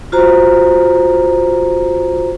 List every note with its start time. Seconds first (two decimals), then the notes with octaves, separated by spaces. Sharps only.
0.12 F4 F#4 C5 A#5